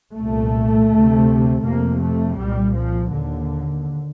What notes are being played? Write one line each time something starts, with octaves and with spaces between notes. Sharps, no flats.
C2 A#2 A3
D2 C3
F2 C3 A#3
A3
C2 A#2 G3
F3
D#2 D3